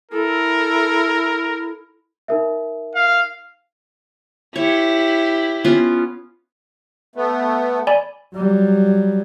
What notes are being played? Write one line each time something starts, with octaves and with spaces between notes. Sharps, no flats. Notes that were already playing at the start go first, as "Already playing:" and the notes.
E4 A4 A#4
D#4 A#4 E5
F5
E4 G4 C#5
B3 C#4 F4
A3 B3
D5 G#5 B5
F#3 G3